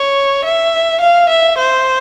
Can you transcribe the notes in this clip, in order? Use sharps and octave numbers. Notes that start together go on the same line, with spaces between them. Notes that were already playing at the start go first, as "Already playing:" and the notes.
Already playing: C#5
E5
F5
E5
C5